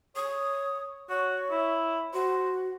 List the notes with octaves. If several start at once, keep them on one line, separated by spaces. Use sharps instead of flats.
C#5 D#6
F#4 C#5
E4
F#4 C5